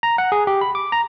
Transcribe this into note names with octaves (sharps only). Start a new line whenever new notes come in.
A#5
F#5
G#4
G4
B5
D6
A#5